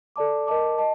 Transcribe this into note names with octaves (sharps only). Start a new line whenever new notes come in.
A4 D5 A5 D6
A#4 D#5 A5 D6
D#5 A5